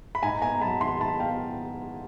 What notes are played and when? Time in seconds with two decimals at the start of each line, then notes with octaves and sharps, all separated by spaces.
0.15 B5
0.23 G#2 G#5 A#5
0.42 B3 G#5 A#5
0.55 A#5
0.61 F#3 A5 B5
0.81 D#3 A#5 C6
1.01 G#2 A5 B5
1.20 B3 F5 G5